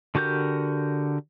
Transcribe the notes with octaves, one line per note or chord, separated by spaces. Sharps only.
D3 F#4 G4 A#4 G6